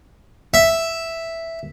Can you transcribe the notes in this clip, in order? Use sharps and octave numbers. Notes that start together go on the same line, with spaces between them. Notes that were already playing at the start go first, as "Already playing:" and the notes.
E5